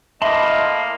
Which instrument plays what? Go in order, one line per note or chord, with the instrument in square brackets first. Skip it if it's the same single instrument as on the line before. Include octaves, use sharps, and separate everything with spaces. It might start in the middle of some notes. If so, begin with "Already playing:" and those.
[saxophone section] A2 A#3 [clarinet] D#5 [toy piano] E5 [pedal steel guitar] A5 B5 C6